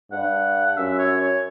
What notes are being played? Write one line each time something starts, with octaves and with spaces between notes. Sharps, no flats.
G2 F#5
F#5
F#2 E5
C#5
C#5